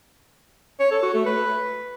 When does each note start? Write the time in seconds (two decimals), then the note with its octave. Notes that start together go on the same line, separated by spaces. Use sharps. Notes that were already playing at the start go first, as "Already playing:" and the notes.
0.80 C#5
0.91 A4
1.03 F#4
1.14 A3
1.26 B4